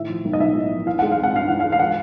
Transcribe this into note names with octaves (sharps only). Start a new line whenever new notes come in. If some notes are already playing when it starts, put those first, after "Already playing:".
Already playing: A2 D#3 E5
F3
B1
D#5
B1 E5
A2
F3
E3 F5
G#3 F#5
F5
C4
F#5
G2 F5
E3 F#5
F5
G#3
F5
F3 F#5